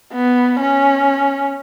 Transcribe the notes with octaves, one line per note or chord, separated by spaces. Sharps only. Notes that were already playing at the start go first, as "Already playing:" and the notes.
B3
C#4